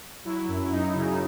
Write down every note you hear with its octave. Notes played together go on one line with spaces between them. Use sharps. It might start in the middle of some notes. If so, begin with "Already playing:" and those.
F#3 E4
F#2
F#2 D#4
C#3
D#4